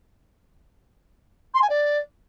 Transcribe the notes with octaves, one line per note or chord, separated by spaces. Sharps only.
C6
G#5
D5